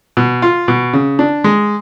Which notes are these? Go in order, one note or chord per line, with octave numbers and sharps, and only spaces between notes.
B2
F4
B2
C#3
D4
G#3